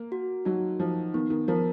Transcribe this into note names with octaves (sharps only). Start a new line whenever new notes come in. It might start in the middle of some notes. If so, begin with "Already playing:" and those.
Already playing: A#3
F#4
F#3 D#4
F3 D#4
D#3 B3
D#3
F3 A#4